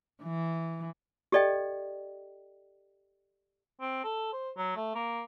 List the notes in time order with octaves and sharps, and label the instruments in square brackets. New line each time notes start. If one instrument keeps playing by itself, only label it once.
[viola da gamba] E3
[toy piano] G4 A4 D5 D#5 G5
[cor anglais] C4
A4
C5
F#3
A3
A#3